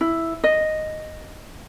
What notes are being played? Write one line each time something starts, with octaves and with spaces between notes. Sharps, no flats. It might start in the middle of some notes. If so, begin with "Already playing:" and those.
E4
D#5